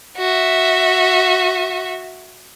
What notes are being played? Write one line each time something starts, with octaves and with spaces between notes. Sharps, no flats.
F#4 E5